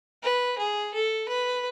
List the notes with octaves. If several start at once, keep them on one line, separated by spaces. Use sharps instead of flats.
B4
G#4
A4
B4